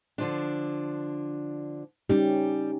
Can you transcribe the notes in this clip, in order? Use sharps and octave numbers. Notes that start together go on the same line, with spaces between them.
D3 F3 D4
G3 C#4 D#4 G4